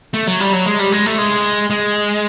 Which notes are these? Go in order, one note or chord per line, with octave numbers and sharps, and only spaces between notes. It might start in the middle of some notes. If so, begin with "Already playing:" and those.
A3
F#3
G3
F#3
G#3
G3
G#3
A3
G#3
G#3